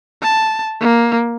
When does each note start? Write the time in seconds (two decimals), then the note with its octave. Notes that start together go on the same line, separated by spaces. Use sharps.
0.23 A5
0.80 A#3